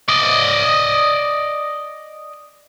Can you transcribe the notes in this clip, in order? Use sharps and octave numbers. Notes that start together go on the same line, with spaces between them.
D5 D#5